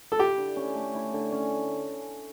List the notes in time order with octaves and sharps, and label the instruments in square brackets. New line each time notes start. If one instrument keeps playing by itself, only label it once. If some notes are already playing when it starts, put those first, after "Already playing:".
[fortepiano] A4
[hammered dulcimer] E4 [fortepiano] G4
[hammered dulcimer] D3
C#4
A3
E4
D3
C#4